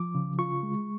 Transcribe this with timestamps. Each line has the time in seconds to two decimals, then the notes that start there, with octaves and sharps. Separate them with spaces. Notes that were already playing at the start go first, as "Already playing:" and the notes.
Already playing: F3 D6
0.15 C#3
0.39 F4 C#6
0.63 G#3